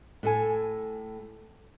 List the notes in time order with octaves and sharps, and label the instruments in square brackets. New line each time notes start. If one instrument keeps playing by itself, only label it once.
[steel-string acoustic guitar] A2 A4 G#5